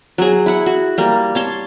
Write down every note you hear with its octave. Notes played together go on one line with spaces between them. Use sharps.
F#3 G#4
E4 F#5
F#4
G3 A#3
C#5 A5 C6